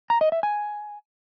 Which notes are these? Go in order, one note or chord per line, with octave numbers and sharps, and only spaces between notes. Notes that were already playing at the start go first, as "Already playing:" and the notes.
A#5
D#5
E5
G#5